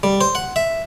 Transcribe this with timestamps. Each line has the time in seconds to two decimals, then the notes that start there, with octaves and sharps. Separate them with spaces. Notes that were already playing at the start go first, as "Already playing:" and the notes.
0.03 G3
0.21 C5
0.35 F#5
0.56 E5